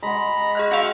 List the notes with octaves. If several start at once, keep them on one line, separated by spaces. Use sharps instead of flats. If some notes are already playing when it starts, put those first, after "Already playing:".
G#3 F#5 A#5 B5
G#4 D#5 F6 F#6
F#4 E5 F5 G5